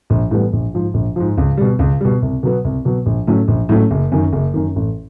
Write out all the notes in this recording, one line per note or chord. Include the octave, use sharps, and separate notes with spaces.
A#1
A2 E3 G3 B3
A#1
G#2 F3
A#1
G#2 F3
C#2
B2 G3
C#2
B2 G3
C2
B2 F#3 B3
C2
B2 F#3 B3
A#1
A2 F#3 A3 C#4
A#1
A2 F#3 A3 C#4
F#1
F#2 D#3
F#1
F#2 D#3
A1